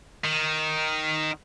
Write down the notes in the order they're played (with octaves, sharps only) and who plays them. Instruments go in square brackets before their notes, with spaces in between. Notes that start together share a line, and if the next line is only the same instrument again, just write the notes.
[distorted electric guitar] D#3